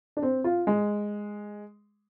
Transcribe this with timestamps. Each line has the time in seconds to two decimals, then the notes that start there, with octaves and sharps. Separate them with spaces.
0.17 D4
0.23 C4
0.44 F4
0.67 G#3